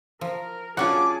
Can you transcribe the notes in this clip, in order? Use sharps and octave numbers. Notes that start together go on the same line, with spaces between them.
F3 A#4
F#3 C#4 D4 F4 G#4 F#5 A5 D6